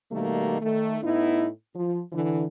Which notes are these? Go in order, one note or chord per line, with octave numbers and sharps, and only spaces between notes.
B2 D#3 G3 A3 A#3
D#3 A3
A2 B3 D#4 E4
F3
D3 E3